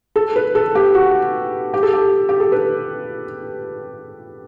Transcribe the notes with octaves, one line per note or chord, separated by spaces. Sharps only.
A4
B4
A4
G4
F#4
G4
A4
G4
G4
A4
B4